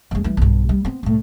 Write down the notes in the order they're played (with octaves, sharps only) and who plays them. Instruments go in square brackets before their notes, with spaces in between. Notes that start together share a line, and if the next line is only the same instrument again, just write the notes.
[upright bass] F2 G#3
E3 G3
B1 G2
G3
B3 C4
C2 A2